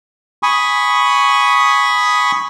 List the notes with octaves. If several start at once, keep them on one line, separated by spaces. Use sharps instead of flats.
G#5 B5 C#6 D#6